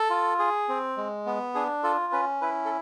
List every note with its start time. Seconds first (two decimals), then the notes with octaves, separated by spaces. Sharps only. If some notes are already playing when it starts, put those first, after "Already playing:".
Already playing: A4
0.10 F4
0.39 G#4
0.69 C4
0.97 G#3
1.26 B3
1.55 D4 G#4
1.83 F4 A4
2.12 C#4 B4
2.41 E4 B4
2.65 A4